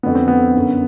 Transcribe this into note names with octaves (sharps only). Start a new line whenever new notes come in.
F2 D3 B3
C4
B3
F#2 D3